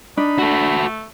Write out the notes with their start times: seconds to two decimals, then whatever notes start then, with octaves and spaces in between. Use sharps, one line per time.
0.17 D4 D#4 B5
0.39 A3 F#4 A4